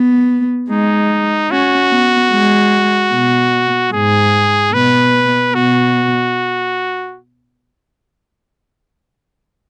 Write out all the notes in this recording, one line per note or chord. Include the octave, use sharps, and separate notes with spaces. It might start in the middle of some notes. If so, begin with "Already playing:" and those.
Already playing: B3
G#3 D#4
C#4 F#4
B3
G#3
B2
G#2 G#4
B2 B4
B2 F#4